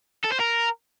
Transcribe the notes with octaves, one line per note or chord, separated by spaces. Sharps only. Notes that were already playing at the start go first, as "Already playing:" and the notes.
A4
C5
A#4